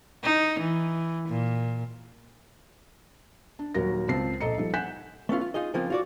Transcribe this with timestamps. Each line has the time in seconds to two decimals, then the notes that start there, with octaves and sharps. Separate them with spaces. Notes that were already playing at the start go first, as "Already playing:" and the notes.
0.24 D#4
0.60 E3
1.29 A#2
3.59 D4
3.74 D#1 D#2 F#3 F#4 A#4 A#6
4.08 C#2 C4 F4 A5 C7
4.41 A#1 A4 D#5 A#5 C#7
4.58 F3 G3 D#4 A4
4.74 F#5 G#5 F#6 G6 B6 E7
5.29 A3 B3 C#4 F4
5.41 F4
5.54 D#4 F4 G#4 D#5
5.74 C#3 F3 A#3 C4 F4
5.90 F4 F#4 D5